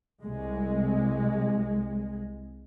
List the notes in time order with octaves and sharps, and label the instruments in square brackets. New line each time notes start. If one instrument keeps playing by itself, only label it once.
[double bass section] C2 G#3